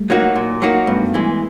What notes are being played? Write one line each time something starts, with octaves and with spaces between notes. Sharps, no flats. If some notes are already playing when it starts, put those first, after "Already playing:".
Already playing: G3 A3
F#3 A#3 D#4 F#4
A#2
F#3 A#3 D#4 F#4
G2 A3 B3
E3 G#3